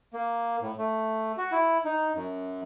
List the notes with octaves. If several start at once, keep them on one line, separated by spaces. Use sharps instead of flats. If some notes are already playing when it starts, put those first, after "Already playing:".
A#3
A2
A3
F#4
E4
D#4
F#2